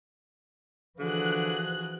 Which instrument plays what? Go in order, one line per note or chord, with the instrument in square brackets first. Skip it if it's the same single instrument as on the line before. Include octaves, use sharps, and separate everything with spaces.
[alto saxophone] D3 [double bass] E3 F3 [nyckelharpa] F#4 G#4 [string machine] F#6